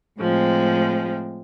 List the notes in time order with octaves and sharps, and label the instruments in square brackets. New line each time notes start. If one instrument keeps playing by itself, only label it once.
[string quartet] A2 F3 G#3 C4